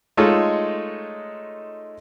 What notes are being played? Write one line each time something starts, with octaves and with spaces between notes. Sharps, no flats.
G#3 A3 D#4 F4 A4 C#5